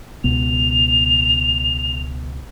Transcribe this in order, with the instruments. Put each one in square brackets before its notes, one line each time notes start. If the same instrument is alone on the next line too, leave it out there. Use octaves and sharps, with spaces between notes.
[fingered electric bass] C#2 B2 B3 [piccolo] F7